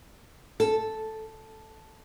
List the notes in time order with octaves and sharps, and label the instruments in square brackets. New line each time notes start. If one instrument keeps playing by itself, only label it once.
[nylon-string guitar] A4